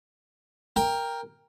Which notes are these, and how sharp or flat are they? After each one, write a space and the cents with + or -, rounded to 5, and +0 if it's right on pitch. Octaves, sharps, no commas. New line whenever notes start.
A#4 +0 G5 +15